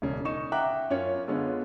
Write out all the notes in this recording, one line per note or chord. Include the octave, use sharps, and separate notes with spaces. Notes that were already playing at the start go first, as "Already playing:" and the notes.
E1 C#3
D#4 C#6 E7
E5 F#5 G5 A#5 D6 F#6
F#2 C#4 F4 C#5
D3 G#3 B3 C#4 F4